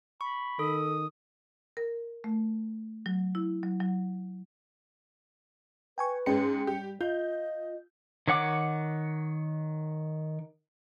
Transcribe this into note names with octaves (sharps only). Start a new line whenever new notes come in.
B5 C#6
D#3 A4 D#6
A#4
A3
F#3
E4
F#3
F#3
B4 G5 G#5 C#6
G#2 G#3 C#4 G5 C#7
G3 G4
F4 D#5 G6
D#3 C#5 F#5 D6